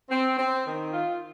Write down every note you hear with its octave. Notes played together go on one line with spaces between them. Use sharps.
C4
C4
D#3
F4